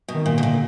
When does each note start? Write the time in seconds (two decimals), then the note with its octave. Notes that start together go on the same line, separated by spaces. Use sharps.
0.08 B2
0.14 D#3
0.26 A#2
0.37 B2 D3
0.43 A#2